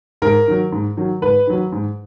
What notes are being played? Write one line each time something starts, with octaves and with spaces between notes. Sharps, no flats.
G#2 A#4
D#3 F#3
G#2
D#3 F#3
G#2 B4
D#3 F#3
G#2